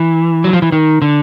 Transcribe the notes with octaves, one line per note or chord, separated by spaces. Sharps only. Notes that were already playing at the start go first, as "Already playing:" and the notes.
Already playing: E3
F#3
F3
E3
D#3
D3